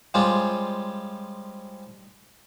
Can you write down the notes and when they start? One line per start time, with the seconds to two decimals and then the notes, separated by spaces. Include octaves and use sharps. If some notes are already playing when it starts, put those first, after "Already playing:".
0.14 F3 G3 G#3 C#4 F4